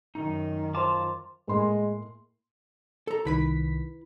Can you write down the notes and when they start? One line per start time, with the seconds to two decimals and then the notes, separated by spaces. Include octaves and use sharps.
0.15 F#2 D#3 D#4
0.74 F4 C5 A5 A#5 C6 D6
1.48 A2 G#3 A#3 C6
3.07 A4 A#5
3.25 C2 D#3 E4 B4 B5 B6